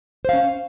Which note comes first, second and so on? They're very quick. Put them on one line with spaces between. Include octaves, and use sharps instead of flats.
C5 F5 C#4